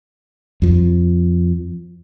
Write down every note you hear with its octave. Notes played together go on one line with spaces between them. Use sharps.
F2 F3